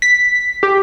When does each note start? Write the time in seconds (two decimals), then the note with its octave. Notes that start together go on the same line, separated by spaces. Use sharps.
0.02 B6
0.63 G4